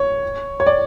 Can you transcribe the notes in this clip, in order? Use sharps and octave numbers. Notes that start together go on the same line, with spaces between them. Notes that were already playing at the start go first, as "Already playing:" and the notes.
Already playing: C#5
C#5
D5